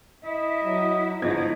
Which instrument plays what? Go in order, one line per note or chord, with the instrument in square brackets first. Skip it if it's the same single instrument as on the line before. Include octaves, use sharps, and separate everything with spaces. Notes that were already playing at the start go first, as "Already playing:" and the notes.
[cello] E4 E5 [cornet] D#5
[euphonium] F#3
[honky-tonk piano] G1 F3 G#6 [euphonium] G#2 [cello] D#4 E4